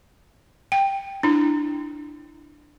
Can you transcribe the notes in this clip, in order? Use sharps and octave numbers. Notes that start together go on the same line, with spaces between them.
G5
D4 E4